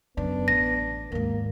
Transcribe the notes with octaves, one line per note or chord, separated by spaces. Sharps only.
F#2 C#3 B3 D4
A1 A#6
D#2 G#2 A#3